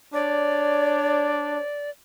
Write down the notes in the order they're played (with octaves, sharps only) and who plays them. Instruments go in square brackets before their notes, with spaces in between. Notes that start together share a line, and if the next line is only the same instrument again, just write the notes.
[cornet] D4 [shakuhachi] C#5 [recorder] D5